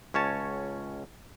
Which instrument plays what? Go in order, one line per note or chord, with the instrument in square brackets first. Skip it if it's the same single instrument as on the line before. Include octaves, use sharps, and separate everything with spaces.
[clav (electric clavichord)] C#2 C#4 C#5 A5